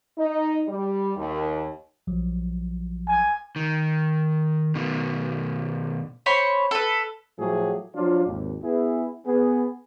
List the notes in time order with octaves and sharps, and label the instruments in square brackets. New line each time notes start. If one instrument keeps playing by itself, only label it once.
[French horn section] D#4
G3
D#2
[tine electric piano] A#1 F3 F#3
[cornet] G#5
[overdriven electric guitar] D#3
B2 D#3
[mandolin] C5 C#5 B5 C6
A4 B4
[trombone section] A2 F3 F#3 A3 G4 G#4
F3 F#3 D4 F4
G#1 D#2
B3 E4 G#4
B3 G#4